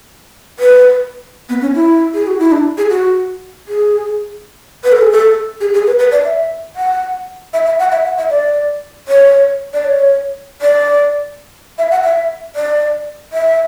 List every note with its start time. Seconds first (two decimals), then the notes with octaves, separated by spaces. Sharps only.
0.60 B4
1.49 B3
1.61 C#4
1.75 E4
2.14 G#4
2.27 F#4
2.39 E4
2.52 D4
2.77 G#4
2.90 F#4
3.68 G#4
4.84 B4
4.92 A4
5.01 G#4
5.12 A4
5.61 G#4
5.74 G#4
5.87 B4
5.99 B4
6.12 D5
6.25 E5
6.76 F#5
7.53 E5
7.66 E5
7.79 F#5
7.92 E5
8.04 F#5
8.18 E5
8.30 D5
9.08 C#5
9.74 D5
9.85 C#5
10.62 D5
11.78 E5
11.91 F#5
12.04 E5
12.56 D5
13.33 E5